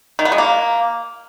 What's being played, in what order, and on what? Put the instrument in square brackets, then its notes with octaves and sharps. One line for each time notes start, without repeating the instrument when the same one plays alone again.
[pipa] D#3
B3
G#3
A#3